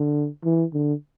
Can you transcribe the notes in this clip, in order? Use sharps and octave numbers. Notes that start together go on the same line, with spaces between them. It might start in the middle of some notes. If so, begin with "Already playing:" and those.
Already playing: D3
E3
D3